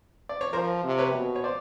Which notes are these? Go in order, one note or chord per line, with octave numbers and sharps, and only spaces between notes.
D5
C#5
F3 A#4 C5
C3
B4 C#5
B2
C#5
C5 D5